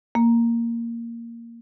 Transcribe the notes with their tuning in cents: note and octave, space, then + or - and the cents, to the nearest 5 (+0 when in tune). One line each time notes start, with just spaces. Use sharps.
A#3 -5